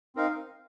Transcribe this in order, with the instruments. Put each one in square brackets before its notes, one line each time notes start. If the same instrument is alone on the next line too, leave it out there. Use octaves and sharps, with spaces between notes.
[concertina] C4 D#4 A#4 F5